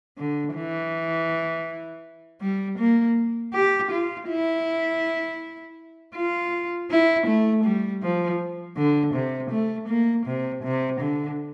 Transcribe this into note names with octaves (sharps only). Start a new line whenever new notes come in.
D3
E3
G3
A#3
G4
F4
E4
F4
E4
A3
G3
F3
D3
C3
A3
A#3
C3
C3
D3